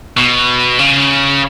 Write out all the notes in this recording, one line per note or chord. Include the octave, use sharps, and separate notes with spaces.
B2
C#3